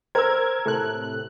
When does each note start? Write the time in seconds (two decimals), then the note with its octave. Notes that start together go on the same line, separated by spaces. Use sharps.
0.15 A#4 C5 E6 G#6
0.66 A2 C3 A4 F#6